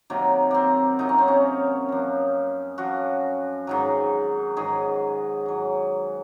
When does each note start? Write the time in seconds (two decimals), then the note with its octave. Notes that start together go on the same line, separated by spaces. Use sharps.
0.10 C3 D#3 F#3 A#3
0.51 A#3 C4
0.99 C3 D#3 F#3 D#4
1.09 C#4
1.18 C4
1.28 C#4
1.89 F#2 F3
2.78 F#2 F3 F#4
3.67 G#2 D#3 F#3
4.57 G#2 D#3 F#3 G#4
5.46 G#2 F#3